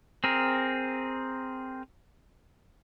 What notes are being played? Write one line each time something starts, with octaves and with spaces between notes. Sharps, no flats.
C4 G#4 A#4